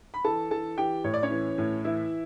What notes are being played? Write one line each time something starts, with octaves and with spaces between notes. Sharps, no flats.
B5
E3 A4 A5
E3 A4 A5
E3 G4 G5
A2 C#5
D5
C#4 C#5
E3
A2
E3 E4 E5